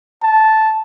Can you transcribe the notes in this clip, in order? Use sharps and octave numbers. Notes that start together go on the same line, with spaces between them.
A5